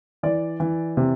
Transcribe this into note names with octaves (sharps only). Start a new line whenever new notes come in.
E3 D5
E3
C3